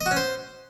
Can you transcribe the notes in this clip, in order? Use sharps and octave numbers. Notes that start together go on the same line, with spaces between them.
D#5
F#4
C#4
C5